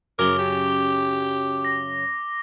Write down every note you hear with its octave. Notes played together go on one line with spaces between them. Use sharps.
F#2 C#3 F#3 A#4 D6 G7
G4
A#6